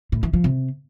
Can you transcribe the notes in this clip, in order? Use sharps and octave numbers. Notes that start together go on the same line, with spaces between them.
A2
E3
F3
C3